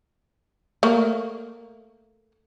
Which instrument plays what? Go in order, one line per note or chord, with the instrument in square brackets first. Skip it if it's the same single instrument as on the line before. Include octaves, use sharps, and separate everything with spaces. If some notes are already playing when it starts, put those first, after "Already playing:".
[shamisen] A3 A#3